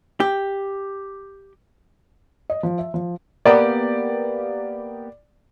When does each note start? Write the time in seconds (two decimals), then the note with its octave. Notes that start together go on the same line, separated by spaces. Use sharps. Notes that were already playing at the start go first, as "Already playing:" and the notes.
0.20 G4
2.50 D#5
2.63 F3
2.79 E5
2.94 F3
3.45 A#3 B3 G4 D5